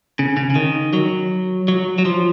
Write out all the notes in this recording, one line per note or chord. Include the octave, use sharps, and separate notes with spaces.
C#3
C#3
C#3
D#3
F#3
F#3
F#3
F3